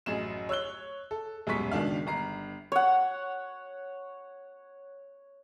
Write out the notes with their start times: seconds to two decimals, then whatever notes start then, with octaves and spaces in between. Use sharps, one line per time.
0.06 A1 F#2 G#4 E7
0.49 C#5 E6 F#6 G7
1.11 A4
1.47 D#1 F#2 B2 G#3 C#6 B6
1.71 C#2 B2 D#3 D4 F5
2.06 G1 A#5 C7
2.72 C#5 F#5